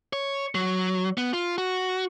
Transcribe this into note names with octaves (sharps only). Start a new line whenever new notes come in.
C#5
F#3
B3
F4
F#4